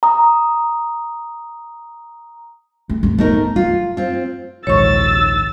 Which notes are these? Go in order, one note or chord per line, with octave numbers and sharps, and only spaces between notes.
A#5 D#6
A3
G#1 D#2
A3 B3 D#4 A#4
F#3 F4
C4 F4
A#1 D#2 G#2 C#5 C#6 E6 A6